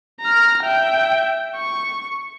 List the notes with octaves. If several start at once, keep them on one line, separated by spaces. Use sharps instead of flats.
A#5 F6
E5 G5
C#6